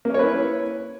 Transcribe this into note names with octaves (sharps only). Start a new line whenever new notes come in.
A#3 C#4 E4 B4 C#5